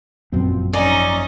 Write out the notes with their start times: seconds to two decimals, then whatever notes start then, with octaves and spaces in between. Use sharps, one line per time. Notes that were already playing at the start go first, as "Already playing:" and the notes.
0.32 G#1 F#2 A#2 F3 B3 C4
0.73 F3 C#4 D#4 D5 D#5 G#5 A#5